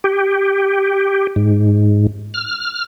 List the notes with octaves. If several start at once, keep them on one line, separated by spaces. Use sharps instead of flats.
G4
G#2
F6